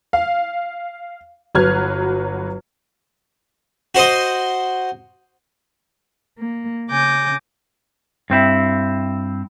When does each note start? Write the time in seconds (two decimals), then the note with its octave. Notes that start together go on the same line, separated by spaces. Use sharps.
0.13 F5
1.55 G1 F#3 B4 F6 G#6
3.95 F#4 C5 D#5 C6
6.39 A#3
6.90 C#3 G#5 D6 G6 A#6
8.30 G2 C4 E4